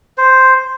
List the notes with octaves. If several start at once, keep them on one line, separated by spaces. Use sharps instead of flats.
C5